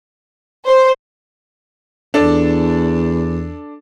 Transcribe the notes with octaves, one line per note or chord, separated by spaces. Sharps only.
C5
E2 D4 A4